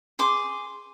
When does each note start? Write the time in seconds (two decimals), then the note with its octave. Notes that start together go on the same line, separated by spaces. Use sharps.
0.19 G#4 C6 D6